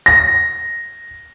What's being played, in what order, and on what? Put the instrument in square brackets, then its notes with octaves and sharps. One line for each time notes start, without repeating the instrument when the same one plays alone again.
[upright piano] A#6